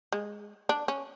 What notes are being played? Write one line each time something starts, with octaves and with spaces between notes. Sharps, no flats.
G#3
D4
C#4